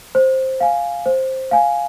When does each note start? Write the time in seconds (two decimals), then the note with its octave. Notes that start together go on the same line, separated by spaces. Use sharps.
0.15 C5
0.60 F5 G#5
1.06 C5
1.51 F5 G#5